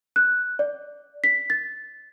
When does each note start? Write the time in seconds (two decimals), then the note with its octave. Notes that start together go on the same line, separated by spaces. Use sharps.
0.16 F#6
0.59 D5
1.24 B6
1.50 A6